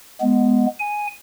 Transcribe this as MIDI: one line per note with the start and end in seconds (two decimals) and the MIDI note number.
0.21 0.66 56
0.21 0.66 59
0.79 1.07 80